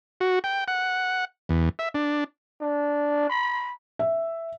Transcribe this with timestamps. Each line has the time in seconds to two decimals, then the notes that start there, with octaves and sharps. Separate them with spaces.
0.21 F#4
0.44 G5
0.68 F#5
1.49 E2
1.79 E5
1.94 D4
2.62 D4
3.30 B5
3.99 E5